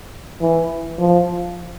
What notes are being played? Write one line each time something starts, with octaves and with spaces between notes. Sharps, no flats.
E3
F3